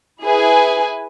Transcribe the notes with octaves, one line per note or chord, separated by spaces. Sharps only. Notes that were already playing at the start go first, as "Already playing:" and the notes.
E4 G#4 B4 G#5